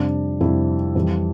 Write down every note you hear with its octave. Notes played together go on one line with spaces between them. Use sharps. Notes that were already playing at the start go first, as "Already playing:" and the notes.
Already playing: F2 C3 G3 D4
F2 C3 G3 E4
F2 E3 G3